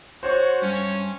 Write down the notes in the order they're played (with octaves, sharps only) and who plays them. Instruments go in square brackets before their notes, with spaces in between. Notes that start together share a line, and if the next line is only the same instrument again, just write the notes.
[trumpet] F#4 [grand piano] C5 C#5 C#6
[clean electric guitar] G2 [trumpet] C#4